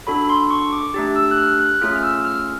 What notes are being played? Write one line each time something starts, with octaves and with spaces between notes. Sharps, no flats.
D4 F#4 A4 B5
C6
C#6
D6
A3 D4 G4
E6
F#6
F6
F#6
A3 C#4 F4 G#4 F6
F6
E6
F6